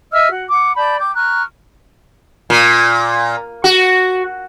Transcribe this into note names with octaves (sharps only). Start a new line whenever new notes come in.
D#5 E5 E6 F6
F#4
F#5 D6
D5 A5 B5 G6
G5 D6 G6
A#5 C#6 F6 F#6
A#2
F#4